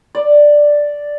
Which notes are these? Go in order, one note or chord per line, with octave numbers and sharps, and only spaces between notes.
D5